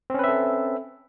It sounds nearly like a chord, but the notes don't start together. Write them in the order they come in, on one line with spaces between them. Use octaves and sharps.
C4 C#4 B4 E5 A4